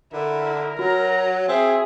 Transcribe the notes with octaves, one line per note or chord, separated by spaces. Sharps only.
D3 E4 A#4
F#3 F#4 A#5
C4 G#4 E5